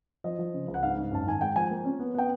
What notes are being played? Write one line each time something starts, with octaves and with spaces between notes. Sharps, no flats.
F3 D#5
F3
C#3
C#2
F#5
G#2 F5
G#2
F#2 A5
D#3 G#5
G#3 G5
F3 G#5
A#3
C#4
B3
B3 G5